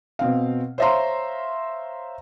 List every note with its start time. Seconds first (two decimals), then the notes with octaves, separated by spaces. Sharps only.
0.19 B2 C4 F5
0.78 C5 C#5 E5 F5 A#5 C6